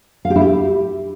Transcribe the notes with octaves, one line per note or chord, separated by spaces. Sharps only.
F5
G4
E4
G4